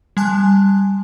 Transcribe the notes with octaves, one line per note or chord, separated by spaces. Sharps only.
G3 G#5 A5 F#6